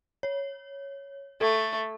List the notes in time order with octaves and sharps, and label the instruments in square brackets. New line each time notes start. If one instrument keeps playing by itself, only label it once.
[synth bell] C#5
[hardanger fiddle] A3 [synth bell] A4